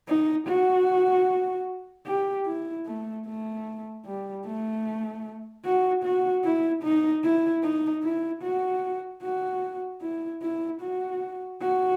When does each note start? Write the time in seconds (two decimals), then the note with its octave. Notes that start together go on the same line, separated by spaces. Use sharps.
0.08 D#4
0.47 F#4
2.07 G4
2.46 E4
2.86 A3
3.26 A3
4.06 G3
4.46 A3
5.65 F#4
6.04 F#4
6.44 E4
6.83 D#4
7.23 E4
7.63 D#4
8.04 E4
8.43 F#4
9.23 F#4
10.01 E4
10.42 E4
10.81 F#4
11.61 F#4